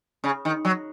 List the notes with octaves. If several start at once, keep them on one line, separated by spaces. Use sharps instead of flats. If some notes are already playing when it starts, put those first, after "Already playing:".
C#3
D#3
F#3